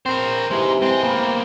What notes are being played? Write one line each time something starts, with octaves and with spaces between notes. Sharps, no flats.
C4 A#4 C5
C3 E3 G#3 D#4
G#3 C4
A#3 B3